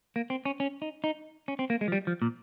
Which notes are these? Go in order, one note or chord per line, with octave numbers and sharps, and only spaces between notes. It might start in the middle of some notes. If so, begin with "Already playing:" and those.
A#3
C4
C#4
C#4
D#4
D#4
C#4
C4
A#3
G#3
F3
G3
F3
A#2